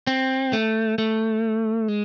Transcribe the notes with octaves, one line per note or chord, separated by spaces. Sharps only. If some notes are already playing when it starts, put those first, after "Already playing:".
C4
A3
A3
G#3